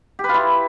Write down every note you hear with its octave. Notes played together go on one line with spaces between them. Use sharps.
G4
B4
F4
E4